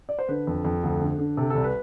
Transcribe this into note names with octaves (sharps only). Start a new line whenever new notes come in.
D5
C5
D3 B4
F2
F2
D2
D3
D3
C3 A4
A4
C2
B4